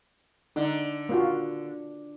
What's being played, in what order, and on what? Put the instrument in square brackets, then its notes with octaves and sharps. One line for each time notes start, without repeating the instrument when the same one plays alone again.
[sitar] D3 [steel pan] D#4
[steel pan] A#3 F4 F#4